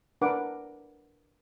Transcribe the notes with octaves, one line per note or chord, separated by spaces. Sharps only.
D4 A#4 B4 F#5 D6